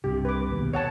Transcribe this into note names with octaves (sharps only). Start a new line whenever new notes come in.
C2 G2 C3 G4
B4 D6
D#2 B2
C#5 F#5 A5